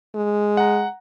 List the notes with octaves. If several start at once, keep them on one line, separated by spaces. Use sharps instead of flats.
G#3
F#5 A#5